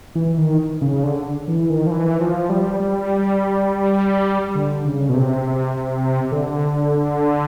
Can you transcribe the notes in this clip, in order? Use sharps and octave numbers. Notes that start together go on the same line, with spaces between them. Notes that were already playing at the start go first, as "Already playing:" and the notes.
E3
D#3
C#3
D3
E3
D#3
F3
E3
F3
G3
G3
D3
C#3
B2
C3
D3